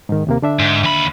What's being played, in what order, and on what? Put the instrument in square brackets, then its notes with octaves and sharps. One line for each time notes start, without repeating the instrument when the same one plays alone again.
[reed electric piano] G#2 D#3
D#2 C3 A#3
D3 D4 E5
[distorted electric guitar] G#2
D#2 B5